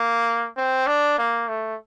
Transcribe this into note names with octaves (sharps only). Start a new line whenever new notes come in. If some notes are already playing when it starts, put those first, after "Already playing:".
Already playing: A#3
C4
D4
A#3
A3